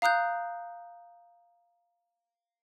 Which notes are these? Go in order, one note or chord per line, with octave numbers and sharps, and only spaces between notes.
F5 A#5 D#6 F#6 G6